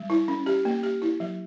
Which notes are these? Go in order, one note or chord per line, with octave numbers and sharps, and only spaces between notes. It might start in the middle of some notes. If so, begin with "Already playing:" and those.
Already playing: G3
E4
C#4
G4
A#3
G4
E4
F#3